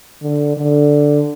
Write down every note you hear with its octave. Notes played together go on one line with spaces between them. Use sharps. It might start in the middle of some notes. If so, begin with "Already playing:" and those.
D3
D3